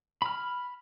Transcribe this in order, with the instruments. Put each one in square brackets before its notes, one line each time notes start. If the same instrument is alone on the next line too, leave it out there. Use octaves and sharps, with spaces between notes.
[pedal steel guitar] B5 F6